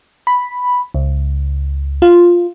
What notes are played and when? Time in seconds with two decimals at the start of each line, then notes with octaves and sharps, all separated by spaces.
0.27 B5
0.94 C#2
2.02 F4